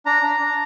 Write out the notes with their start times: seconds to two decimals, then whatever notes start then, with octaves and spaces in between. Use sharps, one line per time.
0.06 D4 A#5
0.23 D4
0.40 D4